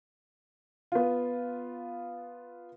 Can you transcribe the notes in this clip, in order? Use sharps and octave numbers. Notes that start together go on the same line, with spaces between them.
B3 F4